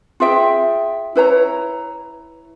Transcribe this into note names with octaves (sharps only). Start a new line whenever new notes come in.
F4 G#4 E5 G5
E4 B4 C#5 A#5